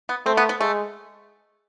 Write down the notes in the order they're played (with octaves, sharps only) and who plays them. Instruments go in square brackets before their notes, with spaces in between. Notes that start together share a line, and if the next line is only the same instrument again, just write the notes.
[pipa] B3
[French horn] A3 [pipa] C4
[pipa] B3
B3
[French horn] G#3 [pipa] A3